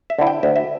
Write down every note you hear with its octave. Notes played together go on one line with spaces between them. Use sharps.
E5
D3 C4 E4
G5
D2 E5
E5